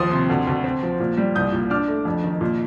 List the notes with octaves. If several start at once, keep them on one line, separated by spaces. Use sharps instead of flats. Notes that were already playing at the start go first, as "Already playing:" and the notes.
Already playing: D#2 F3 C6 D#6
C3
D2
D2
C4
F3
A#2
G3
C2 D#6 G6
A#2
D4 D6 F6
A3
F2
D#3
A#2